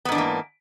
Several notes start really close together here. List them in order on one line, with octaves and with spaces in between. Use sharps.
B3 G#2 D4 E3 A#3